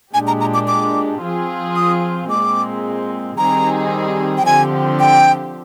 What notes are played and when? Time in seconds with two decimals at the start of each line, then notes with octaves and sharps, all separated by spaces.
0.13 A#2 G#3 D4 G4 G#5
0.27 A#5
0.41 A#5
0.54 D6
0.68 D6
1.22 F3 C4 F4 G#4
1.76 D#6
2.30 A#2 G#3 C4 D6
3.38 D#3 G3 C4 D#4 G#4 A#5
4.38 G5
4.45 D3 F3 C4 G4 G#5
5.00 G5